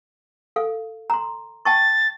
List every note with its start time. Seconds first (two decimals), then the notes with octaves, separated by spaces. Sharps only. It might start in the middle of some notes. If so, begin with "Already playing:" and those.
0.56 A4 F5
1.10 A#5 C6
1.65 G5 A5 C#6 A6